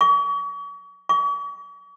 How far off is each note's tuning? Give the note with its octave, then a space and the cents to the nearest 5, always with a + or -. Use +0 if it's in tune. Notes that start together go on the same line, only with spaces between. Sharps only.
C#6 +40
C#6 +45